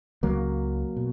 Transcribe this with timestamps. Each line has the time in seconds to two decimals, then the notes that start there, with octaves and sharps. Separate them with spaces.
0.23 C#2 C#3 F#3 A#3
0.97 B2